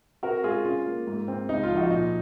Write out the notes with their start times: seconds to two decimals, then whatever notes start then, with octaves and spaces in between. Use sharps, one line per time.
0.23 C4 F#4 A#4
0.43 G#3 F4 G#4
0.65 C#4 F4
0.86 A#3
1.07 G#2
1.28 C4
1.49 C#2 D#4
1.63 F4
1.69 F3
1.76 D#4 F#4
1.90 A#2 D#4